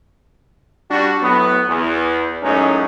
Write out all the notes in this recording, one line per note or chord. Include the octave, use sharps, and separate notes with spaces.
G3 D4 F#4
A2 F#3 B3
E2
F#2 A2 G#3 C#4 D#4